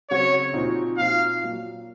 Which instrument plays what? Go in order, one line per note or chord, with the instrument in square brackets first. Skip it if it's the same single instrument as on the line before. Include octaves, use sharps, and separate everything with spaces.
[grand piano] C#3 F#3 C4 F#4 [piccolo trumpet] C#5
[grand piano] A#2 F3 C4 D#4 F#4
[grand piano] A#2 F3 C4 D#4 F#4 [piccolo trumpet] F5
[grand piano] A#2 F#3 A#3